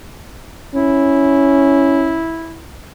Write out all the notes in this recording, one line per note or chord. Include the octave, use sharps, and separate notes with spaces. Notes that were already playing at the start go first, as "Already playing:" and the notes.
C#4 E4